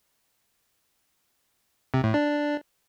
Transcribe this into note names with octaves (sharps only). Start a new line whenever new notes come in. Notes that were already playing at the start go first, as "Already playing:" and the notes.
C3
A2
D4